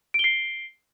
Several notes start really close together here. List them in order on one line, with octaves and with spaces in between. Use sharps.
D7 G7 C7